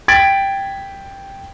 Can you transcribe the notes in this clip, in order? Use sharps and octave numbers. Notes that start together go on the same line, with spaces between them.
G5 G#6 A6 B6 D7 F#7